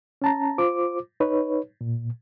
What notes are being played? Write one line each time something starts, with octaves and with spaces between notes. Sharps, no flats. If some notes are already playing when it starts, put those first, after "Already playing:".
C#4 A5 A#5
F4 C5 D6
D#4 B4 C#5
A#2